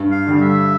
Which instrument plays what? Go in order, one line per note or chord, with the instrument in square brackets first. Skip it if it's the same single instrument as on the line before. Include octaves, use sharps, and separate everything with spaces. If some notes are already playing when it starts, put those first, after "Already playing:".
Already playing: [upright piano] G2
[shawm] F5
[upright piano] D3 G3
[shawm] E5